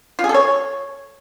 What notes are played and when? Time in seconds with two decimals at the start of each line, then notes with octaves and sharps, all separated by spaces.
0.19 F4
0.24 G#4
0.29 A4
0.34 C#5